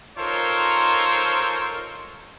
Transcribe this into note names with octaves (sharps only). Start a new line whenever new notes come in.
D#4 F4 A4 A#4 C5 C#5